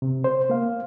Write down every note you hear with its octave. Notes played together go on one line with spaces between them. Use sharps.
C3
C5
A#3 F5